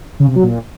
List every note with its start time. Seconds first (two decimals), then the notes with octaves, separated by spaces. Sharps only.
0.20 C#3
0.28 C3
0.36 F#3
0.44 A#2